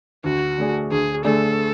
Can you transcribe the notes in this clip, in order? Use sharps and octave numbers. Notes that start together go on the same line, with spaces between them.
D2 F#4
D3 A3 D4 G#4
D2 G#4
D3 A3 D4 G#4 A4